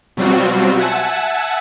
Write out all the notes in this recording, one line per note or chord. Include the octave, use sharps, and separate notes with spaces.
B2 F#3 G3 C4 F4 F#4
E5 F#5 G#5 A5 E6